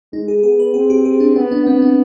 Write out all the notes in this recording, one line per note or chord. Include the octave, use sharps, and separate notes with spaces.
G#3 D#4
G#4
B3 G#4
B4
C4 G#4
G4
G#4
D4
B3 D4
D4
B3 C4
D4